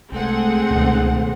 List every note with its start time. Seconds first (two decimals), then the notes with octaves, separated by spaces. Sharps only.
0.12 C2 G#3 A3 C4 G#4 A4 F#5
0.71 C#2 B2 D#3